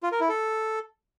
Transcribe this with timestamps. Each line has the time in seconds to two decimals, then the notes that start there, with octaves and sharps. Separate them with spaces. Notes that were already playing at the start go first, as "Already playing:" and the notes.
0.03 F4
0.12 A#4
0.20 E4
0.29 A4